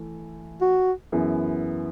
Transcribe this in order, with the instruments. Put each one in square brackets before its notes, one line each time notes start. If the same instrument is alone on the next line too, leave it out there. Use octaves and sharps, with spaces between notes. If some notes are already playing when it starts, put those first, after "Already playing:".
Already playing: [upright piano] E3 A3
[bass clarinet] F#4
[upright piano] F#2 E3 B3 E4 G#4